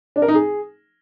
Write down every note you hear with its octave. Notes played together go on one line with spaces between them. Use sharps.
D4
A#4
D#4
G#4